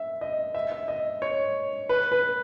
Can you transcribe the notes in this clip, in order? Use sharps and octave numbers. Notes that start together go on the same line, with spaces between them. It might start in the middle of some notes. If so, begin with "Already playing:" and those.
Already playing: E5
D#5
E5
E5
D#5
C#5
B4
B4